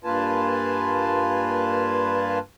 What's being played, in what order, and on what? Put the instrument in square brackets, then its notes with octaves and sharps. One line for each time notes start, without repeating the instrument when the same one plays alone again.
[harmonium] G2 A#3 F4 B4 G#5 A5